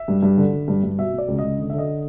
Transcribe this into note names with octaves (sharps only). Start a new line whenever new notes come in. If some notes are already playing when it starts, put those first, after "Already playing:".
Already playing: E5
G2
G2
D3
D3
G2
G2
B2 E5
B2
D5
C#2
C#2 D#5
D3
D3 E5
D#5